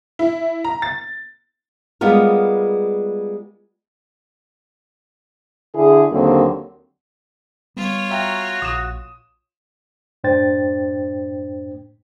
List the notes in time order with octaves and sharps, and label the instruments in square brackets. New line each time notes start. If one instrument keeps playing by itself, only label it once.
[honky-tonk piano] E4
A#5
A6
[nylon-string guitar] G3 G#3 B3 F4 A#4
[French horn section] D3 E4 G#4
D#2 D3 F#3 A#3 C4
[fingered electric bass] G3 B3 [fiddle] F4 C#5
[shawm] F#4 [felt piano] E5 G5 A#5
[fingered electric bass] A#1 [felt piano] D#6 E7
[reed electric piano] F#2 A2 D4 C5 G5 A6